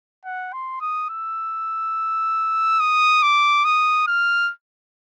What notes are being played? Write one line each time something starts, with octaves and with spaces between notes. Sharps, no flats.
F#5
C6
D#6
E6
D#6
D6
D#6
F6